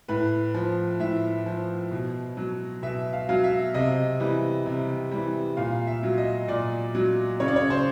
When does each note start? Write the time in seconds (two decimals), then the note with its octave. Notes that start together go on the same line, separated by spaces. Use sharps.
0.08 A2 B4
0.54 F3
1.00 A2 E5
1.46 F3
1.91 B2
2.37 F#3
2.83 B2 E5
3.13 F5
3.29 F#3 F5
3.44 E5
3.74 C3 D#5
4.20 E3 G3
4.66 C3
5.12 E3 G3
5.57 A#2 F5
5.87 E5
6.03 F#3
6.18 D#5
6.48 A#2 D5
6.95 F#3
7.40 C#3 C#5
7.48 D5
7.56 C#5
7.70 C5